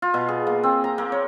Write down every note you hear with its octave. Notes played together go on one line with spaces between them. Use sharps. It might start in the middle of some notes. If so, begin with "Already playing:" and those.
F4
B2
G#4
A#3
C4
A#5
A#3
C#5